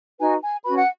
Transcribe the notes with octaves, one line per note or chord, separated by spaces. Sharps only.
D#4 F#4 B4 G#5
G#5
C#4 F#4 B4 B5
F#5